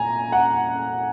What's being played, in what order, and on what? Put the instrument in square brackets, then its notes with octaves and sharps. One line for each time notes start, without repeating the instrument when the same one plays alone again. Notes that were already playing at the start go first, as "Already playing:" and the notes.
Already playing: [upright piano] A#2 G#5 A#5
F#5